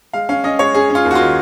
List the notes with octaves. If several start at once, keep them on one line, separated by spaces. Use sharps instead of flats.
G#3 F5
C#4 F5
C#4 D#5
G#3 C#5
C#4 G#4
C#4
F4
D#2
F#4
F4
D#3